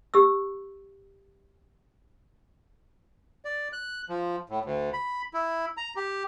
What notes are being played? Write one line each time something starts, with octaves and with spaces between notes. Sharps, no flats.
G4 E6
D5
F#6
F3
A2
D2
B5
E4
A#5
G4